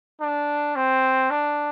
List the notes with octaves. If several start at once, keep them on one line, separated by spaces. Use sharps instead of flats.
D4
C4
D4